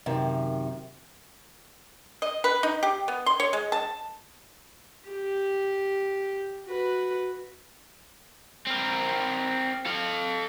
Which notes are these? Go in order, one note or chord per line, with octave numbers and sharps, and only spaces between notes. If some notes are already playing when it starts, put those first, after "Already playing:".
F#2 C3 D#3
D#5
B4
D#4
G4
B3
C6
C#5
G#3
A5
G4
F#4 B4
C4 A#4
A4 F5